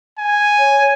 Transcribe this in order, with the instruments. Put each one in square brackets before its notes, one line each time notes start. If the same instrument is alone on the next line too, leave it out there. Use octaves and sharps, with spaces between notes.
[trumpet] G#5
[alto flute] C#5